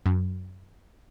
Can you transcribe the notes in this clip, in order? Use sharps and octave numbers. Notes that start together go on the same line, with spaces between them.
F#2